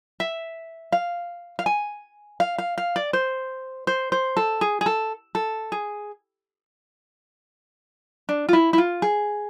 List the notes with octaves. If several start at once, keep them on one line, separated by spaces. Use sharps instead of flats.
E5
F5
F5
G#5
F5
F5
F5
D5
C5
C5
C5
A4
G#4
G#4
A4
A4
G#4
D4
F4
E4
E4
F4
G#4